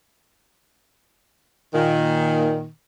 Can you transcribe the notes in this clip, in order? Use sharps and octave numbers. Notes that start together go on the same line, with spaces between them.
A#2 D#3